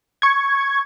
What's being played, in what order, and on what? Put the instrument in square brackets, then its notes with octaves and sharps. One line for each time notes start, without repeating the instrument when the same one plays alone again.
[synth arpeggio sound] C#6 G#6